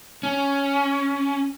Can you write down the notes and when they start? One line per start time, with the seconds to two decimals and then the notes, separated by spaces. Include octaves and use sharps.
0.23 C#4